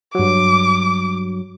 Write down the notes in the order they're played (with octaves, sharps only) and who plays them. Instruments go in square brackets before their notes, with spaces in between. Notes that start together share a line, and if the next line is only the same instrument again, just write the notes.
[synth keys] G2 F#3 [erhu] D6